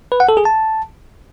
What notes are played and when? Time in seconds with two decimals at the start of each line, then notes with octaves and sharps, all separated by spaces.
0.12 B4
0.20 F#5
0.29 A4
0.37 G#4
0.45 A5